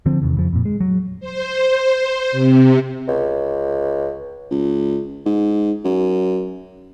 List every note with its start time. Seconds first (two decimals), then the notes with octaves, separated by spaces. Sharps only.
0.06 D3 F3 C4
0.22 E2 C3 D#3
0.37 F2 C#3 F3
0.53 F2 A#2
0.65 G#3
0.80 F#3
1.20 C5
2.32 C3
3.07 C#2
4.51 C#2
5.26 G#2
5.85 F#2